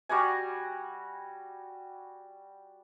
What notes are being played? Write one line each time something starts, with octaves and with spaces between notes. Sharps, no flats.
G3 F#4 F#5 G#5